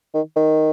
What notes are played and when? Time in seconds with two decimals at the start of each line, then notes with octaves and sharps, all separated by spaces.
0.14 D#3
0.36 D#3